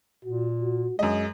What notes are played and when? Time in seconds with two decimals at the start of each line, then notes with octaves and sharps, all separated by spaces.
0.25 A#2 F#4
0.62 F#4
0.99 F#2 G#3 G#4 D#5